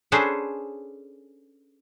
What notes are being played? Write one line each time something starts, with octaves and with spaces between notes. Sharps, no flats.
C#4 D4 G#4 A4 B4 C5